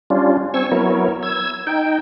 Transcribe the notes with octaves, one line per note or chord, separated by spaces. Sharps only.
G3 C#4 D4 F4
C4 G#5 C#6 E6
F#3 B3 E4 A#4 C#5
E6 G#6
D#4 G5